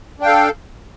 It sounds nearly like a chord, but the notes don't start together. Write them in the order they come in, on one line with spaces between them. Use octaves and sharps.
D4 G5 F5 A4